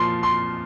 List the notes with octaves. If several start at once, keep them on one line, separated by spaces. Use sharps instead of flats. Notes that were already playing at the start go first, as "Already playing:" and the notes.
Already playing: A#2 F3 C6
C6